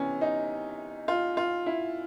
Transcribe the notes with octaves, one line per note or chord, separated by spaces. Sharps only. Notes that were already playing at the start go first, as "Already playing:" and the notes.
Already playing: C3 E3 B3 C#4
D#4
F4
F4
E4